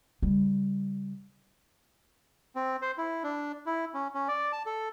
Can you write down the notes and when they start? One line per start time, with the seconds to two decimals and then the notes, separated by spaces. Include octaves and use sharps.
0.22 C#3 G3
2.56 C4
2.82 C5
2.98 E4
3.23 D4
3.66 E4
3.94 C#4
4.14 C#4
4.28 D5
4.52 A5
4.66 A4